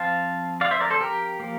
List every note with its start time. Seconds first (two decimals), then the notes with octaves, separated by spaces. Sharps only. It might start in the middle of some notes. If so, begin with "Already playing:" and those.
Already playing: F3 C4 F5 A5
0.61 D5 F5
0.71 C5 E5
0.81 A#4 D5
0.90 A4 C5
1.01 G4 A#4
1.40 F3 A#3